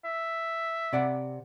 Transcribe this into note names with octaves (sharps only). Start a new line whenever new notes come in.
E5
C3 D5 F#5